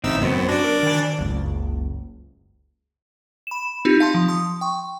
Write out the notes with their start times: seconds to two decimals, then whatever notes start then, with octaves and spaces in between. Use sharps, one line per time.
0.04 A1 C#3 C4 D#4 E6
0.21 F#2 B3 C4
0.49 D4 F#4 D5
0.64 A#4
0.83 D#3 G#5
1.19 F#1 C#2
3.47 B5 E7
3.85 C4 D#4 F4 G4
4.00 F5 A5 C6
4.14 F3
4.28 C6 D#6
4.61 G5 C#6